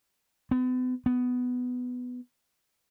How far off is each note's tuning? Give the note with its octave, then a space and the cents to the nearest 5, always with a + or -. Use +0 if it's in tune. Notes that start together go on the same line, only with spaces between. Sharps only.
B3 +40
B3 +10